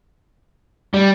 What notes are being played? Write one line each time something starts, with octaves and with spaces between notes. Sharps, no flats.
G3